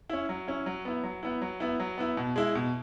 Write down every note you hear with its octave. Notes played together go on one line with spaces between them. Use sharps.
C#4 E4
F#3
C#4 E4
F#3
B3 E4
F#3
B3 E4
F#3
B3 E4
F#3
B3 E4
B2
G#3 E4
B2